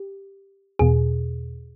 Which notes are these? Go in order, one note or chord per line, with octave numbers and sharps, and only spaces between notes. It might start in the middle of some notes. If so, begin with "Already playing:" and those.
Already playing: G4
E2 B2 G#4